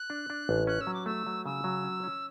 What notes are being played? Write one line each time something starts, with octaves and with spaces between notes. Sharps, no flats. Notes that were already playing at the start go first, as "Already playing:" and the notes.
Already playing: F#6
D4
D4
A1
C#4 F#6
E6
F#3
D6
A3 E6
F#3
C#3 E6
F#3
C#4
C#4